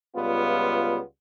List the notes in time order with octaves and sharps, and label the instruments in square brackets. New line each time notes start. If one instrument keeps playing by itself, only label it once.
[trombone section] C#2 G3 B3 F4